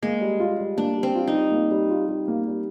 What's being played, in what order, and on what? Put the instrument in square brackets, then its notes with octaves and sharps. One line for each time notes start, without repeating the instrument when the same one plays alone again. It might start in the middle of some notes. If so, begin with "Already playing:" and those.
[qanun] G#3 [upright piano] A#3
[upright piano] G3
F4
G3
[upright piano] A#3 [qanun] D4
[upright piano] G3
[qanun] C4
[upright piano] F4
[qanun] D#4
[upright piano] G3
A#3
G3
F4
G3
A#3
G3